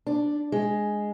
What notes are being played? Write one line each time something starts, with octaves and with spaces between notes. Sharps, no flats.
D4
G#3